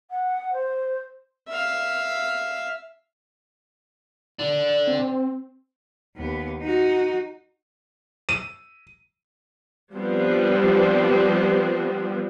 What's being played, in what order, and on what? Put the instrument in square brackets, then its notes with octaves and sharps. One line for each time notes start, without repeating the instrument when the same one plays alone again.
[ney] F#5
C5
[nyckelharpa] E5 F5
[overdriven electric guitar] D3 D4
[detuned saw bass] C4
[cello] D#2 B3
D#4 F#4
[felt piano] D#7
[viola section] F3 G3 B3 C4 D4